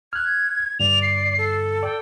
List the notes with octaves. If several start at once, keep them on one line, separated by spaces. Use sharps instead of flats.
F6 F#6 G#6
G2 D3 D5 F7
C7
A4
D5 G5